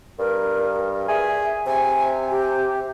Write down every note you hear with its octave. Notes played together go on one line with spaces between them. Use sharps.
G2 A#4
G#4 E5
C3 G#5
G4